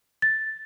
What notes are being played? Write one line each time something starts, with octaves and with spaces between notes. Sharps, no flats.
A6